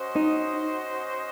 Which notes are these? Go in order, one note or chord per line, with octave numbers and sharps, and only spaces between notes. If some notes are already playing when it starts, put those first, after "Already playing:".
Already playing: C#4 F#4 C5 D#5
D#4